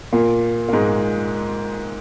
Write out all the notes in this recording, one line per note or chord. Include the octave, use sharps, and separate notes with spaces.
A#2 A#3
A#3
G#2 G#3